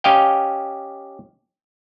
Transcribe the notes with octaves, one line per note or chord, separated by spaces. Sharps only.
C#4 G4 D#5 F5 G5